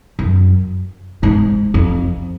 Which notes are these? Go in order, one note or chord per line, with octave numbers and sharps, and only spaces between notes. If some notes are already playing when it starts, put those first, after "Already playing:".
F#2
G#2
F2